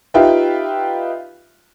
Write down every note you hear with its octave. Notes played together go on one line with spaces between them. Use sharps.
D#4 F4 G4 B4 E5 G5